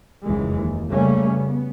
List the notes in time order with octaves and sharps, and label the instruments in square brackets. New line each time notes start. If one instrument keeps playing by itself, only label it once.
[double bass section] F1 C#2 F#2 E3 G#3
D#2
C#3 G3 A3 A#3 C#4
B3